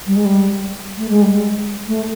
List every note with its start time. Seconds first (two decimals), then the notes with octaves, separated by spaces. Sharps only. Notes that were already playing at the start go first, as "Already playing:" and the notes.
0.07 G3
0.16 G#3
0.25 G3
0.98 A3
1.09 G#3
1.22 G3
1.34 G#3
1.88 A3